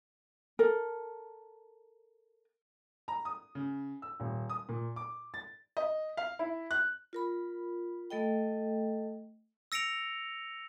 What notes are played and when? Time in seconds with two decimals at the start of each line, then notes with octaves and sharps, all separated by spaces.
0.59 A4 A#4
3.08 A#5
3.25 D#6
3.55 C#3
4.02 E6
4.20 D#1
4.49 D#6
4.69 A#2
4.96 D6
5.34 A6
5.77 D#5
6.17 F5
6.39 E4
6.71 F#6
7.13 F4 A#4 B5
8.11 A3 A4 D#5 G5
9.72 E6 A#6 C#7 D7 F7